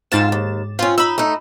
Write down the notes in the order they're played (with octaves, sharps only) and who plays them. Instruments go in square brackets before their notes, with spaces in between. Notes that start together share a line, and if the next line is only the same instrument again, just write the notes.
[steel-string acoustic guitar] F2 F4 [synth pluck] G#2 A6 E7
[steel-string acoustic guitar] D#2
[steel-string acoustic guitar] C4 C#4 [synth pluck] F4
[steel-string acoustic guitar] D#4 [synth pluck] B5 E6
[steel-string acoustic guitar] A3 D#4